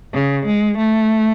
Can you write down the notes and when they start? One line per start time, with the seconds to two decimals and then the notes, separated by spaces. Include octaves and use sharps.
0.13 C#3
0.46 G#3
0.78 A3